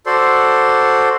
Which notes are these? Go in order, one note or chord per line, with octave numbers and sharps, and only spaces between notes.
F#4 A4 C5 D5 C6